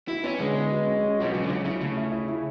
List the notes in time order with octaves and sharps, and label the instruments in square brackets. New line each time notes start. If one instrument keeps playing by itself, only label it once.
[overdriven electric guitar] E4 [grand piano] F#4
[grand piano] B3 [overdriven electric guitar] C#4
[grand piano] D3 [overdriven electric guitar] G#3
[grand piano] B3
F#4
C#4
C#4
[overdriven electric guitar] B2 [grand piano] F#3
[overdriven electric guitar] C#3 [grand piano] F#3
[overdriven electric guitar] D3
[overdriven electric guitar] C#3 [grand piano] F#3
[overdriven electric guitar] C#3 [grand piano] E4
[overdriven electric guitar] C#3 [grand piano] A3
[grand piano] E4
E4
E4